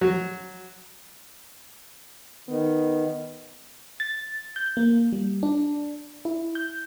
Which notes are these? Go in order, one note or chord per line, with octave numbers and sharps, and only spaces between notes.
F#3
D#3 B3
A6
G6
A#3
G3
D4
E4
G6